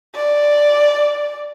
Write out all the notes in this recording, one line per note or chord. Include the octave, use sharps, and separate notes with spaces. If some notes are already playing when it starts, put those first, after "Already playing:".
D5